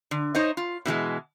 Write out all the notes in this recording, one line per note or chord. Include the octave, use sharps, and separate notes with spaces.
D3
D#4 C5 C#5 D#5
F4
B2 E3 G3 G#3